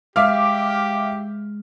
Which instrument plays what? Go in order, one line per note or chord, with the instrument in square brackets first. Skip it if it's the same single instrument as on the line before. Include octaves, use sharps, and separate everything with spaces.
[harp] G#3 [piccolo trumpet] G4 [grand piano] E5 D6 F6 [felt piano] F5